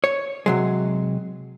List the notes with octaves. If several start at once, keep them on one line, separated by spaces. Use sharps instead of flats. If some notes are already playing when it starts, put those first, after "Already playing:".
C#5
C3 F#3 G#3